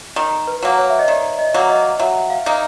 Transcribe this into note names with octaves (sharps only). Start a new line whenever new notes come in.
D#3
B4
F#3 A#3
C#5
E5
D#5
D#3 D5
D#5
F#3 A#3
D#5
F#3 E5
F5
A#3 D#4